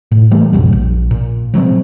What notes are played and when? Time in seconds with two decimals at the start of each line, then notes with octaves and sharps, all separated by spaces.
0.12 A2
0.31 E3 G3 A3 A#3
0.53 A1 F2 B2 G3
0.72 A#1
1.11 A#2
1.54 F3 F#3 G#3 C4